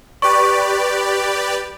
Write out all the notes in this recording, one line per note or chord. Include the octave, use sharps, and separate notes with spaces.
G4 B4 D5 C#6